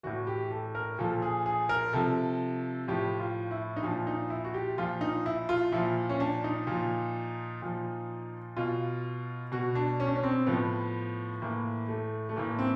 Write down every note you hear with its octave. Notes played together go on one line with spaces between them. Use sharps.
A2 E3 F#4
G4
A4
A#4
A#2 F3 A4
G#4
G#4
A#4
C3 F3 A4
A2 F3 G4
F4
E4
D#4
A#2 F3 D4
D#4
E4
F#4
G4
A#2 F3 F4
D#4
E4
F4
A#2 F3 E4
C#4
D4
D#4
A#2 F3
A#2 F3
B2 F4
B2 F#4
D4
C#4
D4
C#4
C4
A2 F3 B3
A2 E3 A#3
A3
A3
A2 E3 A#3
C4